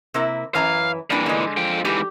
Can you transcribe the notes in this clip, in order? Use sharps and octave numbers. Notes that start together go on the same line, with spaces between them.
C3 A#3 E4
F#2 E3 F5 A#5
A#2 E3 G3 D4
D3 G#3
F3 G5
G#2 E3 G4